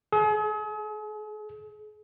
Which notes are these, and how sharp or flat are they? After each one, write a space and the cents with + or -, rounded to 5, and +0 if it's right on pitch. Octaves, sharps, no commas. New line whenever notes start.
G#4 +40